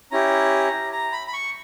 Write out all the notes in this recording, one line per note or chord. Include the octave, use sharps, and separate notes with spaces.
C#4 E4 G4 A#5
A#5
B5
B5
C#6